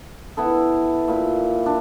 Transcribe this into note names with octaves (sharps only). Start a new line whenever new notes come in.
B3 E4 A4
A#2 B5
D4